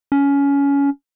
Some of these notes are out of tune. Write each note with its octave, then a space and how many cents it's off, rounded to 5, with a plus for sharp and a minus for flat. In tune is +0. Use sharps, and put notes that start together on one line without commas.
C#4 +20